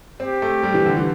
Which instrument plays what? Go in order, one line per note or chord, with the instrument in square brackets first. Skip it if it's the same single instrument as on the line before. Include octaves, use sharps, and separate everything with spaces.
[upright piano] C4 [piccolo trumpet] G4
[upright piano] A3
G3
E3
D3
E3